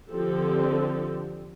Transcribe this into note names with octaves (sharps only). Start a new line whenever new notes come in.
D3 F3 C4 G4 A4